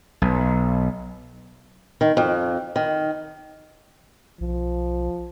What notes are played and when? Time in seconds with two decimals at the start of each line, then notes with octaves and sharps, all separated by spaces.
0.22 B1
2.01 D#3
2.17 F2
2.76 D#3
4.41 B1 F3